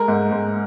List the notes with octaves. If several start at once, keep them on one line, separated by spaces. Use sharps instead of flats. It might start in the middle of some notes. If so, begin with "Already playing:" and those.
Already playing: G#3 A#4
G#2
G#2